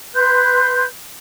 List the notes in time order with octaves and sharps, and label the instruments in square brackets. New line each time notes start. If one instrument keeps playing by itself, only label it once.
[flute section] B4 C6 F#6 G6